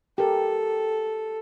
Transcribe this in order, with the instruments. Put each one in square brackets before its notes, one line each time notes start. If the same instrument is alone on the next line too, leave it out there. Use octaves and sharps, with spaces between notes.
[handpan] G4 A#4 [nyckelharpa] A4